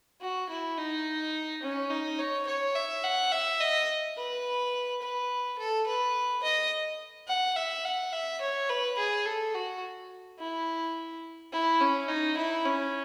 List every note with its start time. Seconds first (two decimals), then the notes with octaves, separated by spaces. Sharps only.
0.21 F#4
0.50 E4
0.78 D#4
1.63 C#4
1.91 D#4
2.19 C#5
2.47 C#5
2.76 E5
3.04 F#5
3.32 E5
3.61 D#5
4.17 B4
5.02 B4
5.59 A4
5.87 B4
6.44 D#5
7.28 F#5
7.56 E5
7.85 F#5
8.13 E5
8.41 C#5
8.69 B4
8.98 G#4
9.26 A4
9.54 F#4
10.39 E4
11.53 E4
11.81 C#4
12.08 D#4
12.38 E4
12.65 C#4